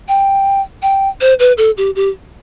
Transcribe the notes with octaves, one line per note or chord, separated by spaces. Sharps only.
G5
G5
C5
B4
A4
G4
G4